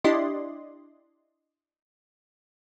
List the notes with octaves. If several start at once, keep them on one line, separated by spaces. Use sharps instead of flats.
D4 E4 G4 D5 D#5 C6